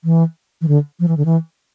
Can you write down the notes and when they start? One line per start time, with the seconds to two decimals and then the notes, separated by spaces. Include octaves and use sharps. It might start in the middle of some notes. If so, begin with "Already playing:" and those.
0.04 E3
0.61 E3
0.68 D3
1.00 F3
1.08 E3
1.17 D3
1.25 E3